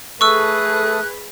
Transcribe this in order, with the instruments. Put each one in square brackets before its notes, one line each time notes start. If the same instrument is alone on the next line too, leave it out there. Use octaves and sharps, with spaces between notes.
[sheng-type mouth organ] A3 A4 D#6 [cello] G#4 B4 [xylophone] C#6 E6 [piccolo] F#6